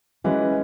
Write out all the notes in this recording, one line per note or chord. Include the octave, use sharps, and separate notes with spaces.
E3 G#3 C#4 F#4 B4 D#5